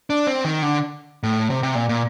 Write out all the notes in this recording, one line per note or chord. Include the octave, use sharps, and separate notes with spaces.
D4
C4
D#3
D3
A2
C3
C3
A#2
A#2